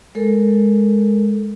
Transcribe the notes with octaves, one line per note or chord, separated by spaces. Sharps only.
G#3 A4 A#4